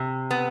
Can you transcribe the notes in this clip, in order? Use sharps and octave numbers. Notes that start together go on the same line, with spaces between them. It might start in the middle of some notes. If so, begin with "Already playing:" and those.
Already playing: C3
B3